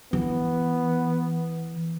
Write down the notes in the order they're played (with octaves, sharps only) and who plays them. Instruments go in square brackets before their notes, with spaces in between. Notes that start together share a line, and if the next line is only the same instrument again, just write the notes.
[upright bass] E3 [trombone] B3